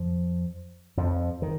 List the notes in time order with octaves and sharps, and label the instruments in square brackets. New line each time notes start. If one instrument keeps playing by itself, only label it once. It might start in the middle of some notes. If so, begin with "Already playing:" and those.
Already playing: [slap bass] F2 F3
F2 F3
D#3